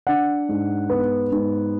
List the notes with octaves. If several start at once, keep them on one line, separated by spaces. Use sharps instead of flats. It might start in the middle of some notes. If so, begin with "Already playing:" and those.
D4 F#5
G#2
B3
G#2